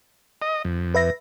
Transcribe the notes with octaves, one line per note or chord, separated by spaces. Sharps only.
D#5
F2
B4 E5 A#6